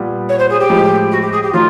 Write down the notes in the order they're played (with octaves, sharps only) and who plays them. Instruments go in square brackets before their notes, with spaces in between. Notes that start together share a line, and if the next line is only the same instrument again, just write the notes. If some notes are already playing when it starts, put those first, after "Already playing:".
Already playing: [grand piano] A#2 G3 B3
[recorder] C#5
C5
G#4
G4
[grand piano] A2 F3 G#3
[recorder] F#4
G4
G#4
G4
[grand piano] D#3 F#3 A3 [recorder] F4